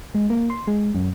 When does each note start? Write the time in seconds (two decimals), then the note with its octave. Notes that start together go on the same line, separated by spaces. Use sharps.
0.15 G#3
0.30 A#3
0.50 C6
0.67 G#3
0.95 F#2